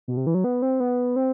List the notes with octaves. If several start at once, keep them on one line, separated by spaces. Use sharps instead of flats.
B2
C3
E3
F#3
B3
C4
B3
C4